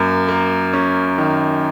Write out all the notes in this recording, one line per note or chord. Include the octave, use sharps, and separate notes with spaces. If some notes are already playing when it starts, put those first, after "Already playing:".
Already playing: F#2 A#3
A#3
C#4
D#3